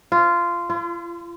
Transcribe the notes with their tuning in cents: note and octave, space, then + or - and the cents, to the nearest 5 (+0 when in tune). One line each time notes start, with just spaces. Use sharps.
F4 -15
F4 -40